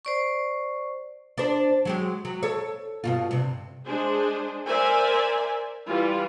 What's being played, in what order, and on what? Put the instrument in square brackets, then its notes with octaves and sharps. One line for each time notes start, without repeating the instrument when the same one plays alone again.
[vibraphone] C5 D5 C#6
[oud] D4 C5
F#3 G#3 G4
F#3
A4 C#5
G2 B2 F4
G2 C3
[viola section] G#3 D4 G#4 C5
A#4 C5 D5 E5 G#5
E3 G3 F4